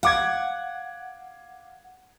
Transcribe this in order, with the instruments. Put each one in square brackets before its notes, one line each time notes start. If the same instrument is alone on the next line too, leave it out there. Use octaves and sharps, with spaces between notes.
[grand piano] F5 D6 G#6 [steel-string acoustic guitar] F#5